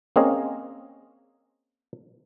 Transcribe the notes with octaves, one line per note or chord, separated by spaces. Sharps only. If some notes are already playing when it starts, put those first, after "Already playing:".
A#3 C4 C#4 G#4 D#5 F5